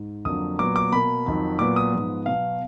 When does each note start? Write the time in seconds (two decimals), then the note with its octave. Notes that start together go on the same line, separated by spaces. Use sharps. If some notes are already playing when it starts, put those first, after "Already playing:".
Already playing: G#2
0.25 F2 D3 F#3 A#3 D#6
0.59 A#2 F#3 B3 D6
0.76 D6
0.92 B2 A#3 B5
1.26 F2 D#3 F#3
1.59 A#2 F#3 B3 D6
1.76 D#6
1.92 G#2 F3 B3
2.26 B2 F#3 B3 F5